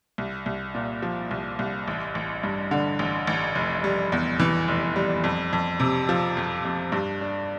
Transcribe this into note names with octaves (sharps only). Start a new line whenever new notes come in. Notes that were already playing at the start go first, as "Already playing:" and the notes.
C2
C2
A#2
F3
C2
C2
A1
A1
G2
D3
A1
A1
F1
G3
E2
E3
F1
G3
F2
F2
C3
F3
F2
F2
G2
D4